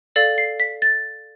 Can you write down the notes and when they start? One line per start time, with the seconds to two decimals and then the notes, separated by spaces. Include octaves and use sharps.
0.16 A4 D5 F5 A6
0.38 C7
0.60 B6
0.82 A6